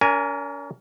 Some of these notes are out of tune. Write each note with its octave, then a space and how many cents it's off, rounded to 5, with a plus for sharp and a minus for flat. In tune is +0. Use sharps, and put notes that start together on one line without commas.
C#4 +45 A#4 +0 G#5 +0